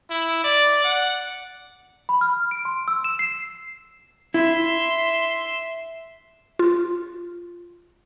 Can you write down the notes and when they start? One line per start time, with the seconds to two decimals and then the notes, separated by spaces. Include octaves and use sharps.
0.10 E4
0.44 D5
0.84 F#5
2.09 B5
2.21 F6
2.51 D7
2.65 C6
2.88 E6
3.04 E7
3.19 C7
4.34 E4 E5 C6
6.59 F4